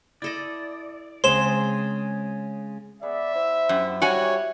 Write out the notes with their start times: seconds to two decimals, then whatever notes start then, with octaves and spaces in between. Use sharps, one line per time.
0.22 E4 A4 D5 D#5
1.24 C#3 G#3 C4 G#4 C5 C#5 C6 E7
3.03 B3 G#4 D5 E5
3.35 E4 C5
3.69 F#2 G4
4.02 G3 E4 F#4 C#5 D5 G#5